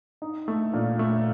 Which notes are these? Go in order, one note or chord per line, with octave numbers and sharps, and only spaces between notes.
D#4
A3
A#2
A3